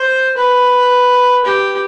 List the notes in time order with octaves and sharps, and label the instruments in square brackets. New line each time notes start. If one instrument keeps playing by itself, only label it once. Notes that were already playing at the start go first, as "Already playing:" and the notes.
Already playing: [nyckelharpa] C5
B4
G4